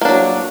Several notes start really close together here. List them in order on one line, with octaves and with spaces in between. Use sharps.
A#3 D4 F#3